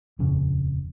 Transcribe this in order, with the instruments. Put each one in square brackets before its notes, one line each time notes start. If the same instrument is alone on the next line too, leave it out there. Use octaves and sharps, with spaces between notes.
[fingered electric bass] D#1 F2 C#3